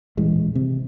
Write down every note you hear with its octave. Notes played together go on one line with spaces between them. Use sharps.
D#1 A1 E3 G#3
C3